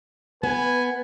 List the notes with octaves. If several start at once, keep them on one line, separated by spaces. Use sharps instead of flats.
B3 B4 G#5